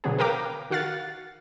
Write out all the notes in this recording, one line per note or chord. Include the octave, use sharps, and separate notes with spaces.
B2 D3 F#3 B3 G#4
A#4 B4 F5 G5 A#5 D6
D#3 F#4 F5 F#5 A6